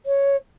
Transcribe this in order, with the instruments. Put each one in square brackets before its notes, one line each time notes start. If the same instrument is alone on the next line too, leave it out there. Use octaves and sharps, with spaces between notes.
[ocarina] C#5